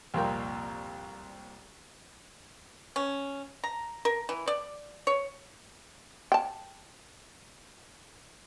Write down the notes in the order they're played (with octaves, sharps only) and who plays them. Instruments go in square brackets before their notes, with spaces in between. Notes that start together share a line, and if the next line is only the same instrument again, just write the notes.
[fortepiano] C2 F2 A#2 A#3 A#4 G5
[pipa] C#4
A#5
A#4
E3
D5
C#5
[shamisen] G5 A5